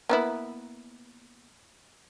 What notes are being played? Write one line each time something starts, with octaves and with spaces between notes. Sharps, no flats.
A#3 B3 E4